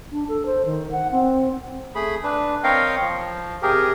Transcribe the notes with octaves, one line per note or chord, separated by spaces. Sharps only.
D4
A4
C5
D#3
F#5
C4
A3 G#4 B5
D4 B4
C4 A#4 C#5 D#5 F5 G5
F3
C3 G4 G#4 A#4